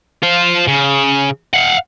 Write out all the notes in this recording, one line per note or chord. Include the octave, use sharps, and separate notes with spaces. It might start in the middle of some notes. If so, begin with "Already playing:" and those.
F4 C5
C#3
F5 F#5